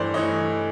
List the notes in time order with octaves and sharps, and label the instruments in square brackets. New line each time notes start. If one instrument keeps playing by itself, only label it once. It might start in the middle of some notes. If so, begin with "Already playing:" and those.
Already playing: [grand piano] G2 E3 A3 C5 D5
E3 A3 C#5 D#5